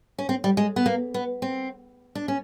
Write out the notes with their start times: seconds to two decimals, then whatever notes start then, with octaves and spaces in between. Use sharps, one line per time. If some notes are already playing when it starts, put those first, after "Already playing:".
0.18 C#4
0.29 C4
0.44 G3
0.57 G#3
0.76 B3
0.86 A#3
1.14 B3
1.42 C4
2.15 D4
2.28 C#4